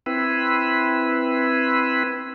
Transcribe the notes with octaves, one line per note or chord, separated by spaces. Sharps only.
C4 E4 B4